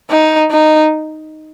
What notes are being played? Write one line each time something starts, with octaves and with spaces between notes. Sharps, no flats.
D#4
D#4